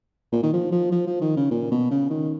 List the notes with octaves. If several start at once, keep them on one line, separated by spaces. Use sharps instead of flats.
A#2
D#3
F3
F3
F3
F3
D#3
C#3
A#2
B2
C#3
D#3